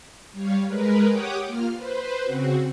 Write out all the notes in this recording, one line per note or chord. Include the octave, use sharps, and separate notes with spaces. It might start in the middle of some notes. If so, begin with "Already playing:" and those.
G3 C#5 F5
G#3 A#4 B4
G4 C#5 F#5 G5 D6 D#6
A#3 F4 F6
B4 C5
C#3 C4 F#4